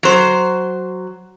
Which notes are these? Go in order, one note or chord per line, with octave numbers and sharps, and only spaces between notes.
F#3 C5